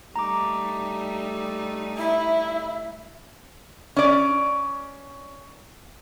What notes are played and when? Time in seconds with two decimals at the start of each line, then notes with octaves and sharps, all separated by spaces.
0.16 G3 A3 D#4 A#5 D6
1.97 E4 E5
3.96 C#4 D5